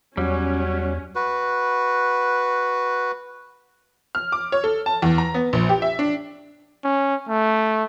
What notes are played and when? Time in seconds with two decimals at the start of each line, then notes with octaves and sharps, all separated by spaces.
0.17 E2 F#3 G3 C#4
1.15 F#4 B4
4.15 F6
4.32 D6
4.52 C#5
4.64 A4
4.86 A5
5.02 E2
5.18 A#5
5.34 B3
5.53 A#1
5.69 G4
5.82 E5
5.99 D4
6.84 C#4
7.29 A3